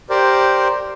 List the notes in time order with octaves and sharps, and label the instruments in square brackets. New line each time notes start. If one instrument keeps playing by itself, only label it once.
[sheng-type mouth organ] G4 A#4 C5 D5